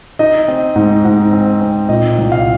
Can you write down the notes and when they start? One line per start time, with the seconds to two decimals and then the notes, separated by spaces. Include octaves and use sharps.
0.19 D#4 D#5
0.48 C4
0.76 G#2
1.05 G#2
1.33 C4
1.61 C4
1.89 A#2 D#5
2.18 C2
2.32 F5